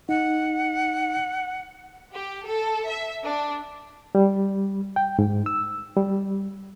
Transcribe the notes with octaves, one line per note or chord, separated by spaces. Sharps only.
D#4 F#5
G4
A4
E5
D4
G3
G5
G#2
E6
G3